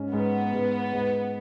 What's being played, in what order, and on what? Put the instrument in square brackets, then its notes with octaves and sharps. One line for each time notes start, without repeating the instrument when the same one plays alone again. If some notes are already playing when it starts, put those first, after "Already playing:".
Already playing: [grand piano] G#2 C#4
[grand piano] G#2 [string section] B3
[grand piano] G#2
G#2